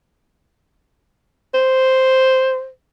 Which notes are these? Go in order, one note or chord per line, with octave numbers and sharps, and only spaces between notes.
C5